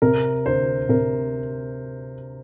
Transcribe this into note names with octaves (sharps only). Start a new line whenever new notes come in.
C3 A#4
D2 C5
C3 A#4